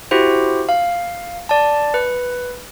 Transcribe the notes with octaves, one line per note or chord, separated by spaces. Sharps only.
E4 F#4 G4 C5
F5
D5 A5
B4